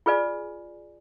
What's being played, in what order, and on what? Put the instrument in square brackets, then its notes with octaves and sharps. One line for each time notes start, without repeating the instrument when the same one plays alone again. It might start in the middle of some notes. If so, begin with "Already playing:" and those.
[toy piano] F4 G#4 B4 D5 G#5